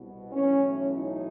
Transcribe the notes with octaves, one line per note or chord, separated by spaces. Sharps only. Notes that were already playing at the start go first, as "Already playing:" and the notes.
Already playing: C2 B2
B1 A2 E3 C#4
D#4